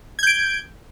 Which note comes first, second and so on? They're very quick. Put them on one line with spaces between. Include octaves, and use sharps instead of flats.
G#6 G6 D7